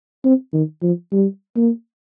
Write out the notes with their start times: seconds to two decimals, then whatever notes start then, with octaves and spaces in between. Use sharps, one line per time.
0.24 C4
0.53 D#3
0.83 F3
1.12 G3
1.56 A#3